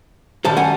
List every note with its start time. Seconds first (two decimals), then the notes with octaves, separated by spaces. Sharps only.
0.45 F#2 D#3 G3 A5
0.57 F#5 G#5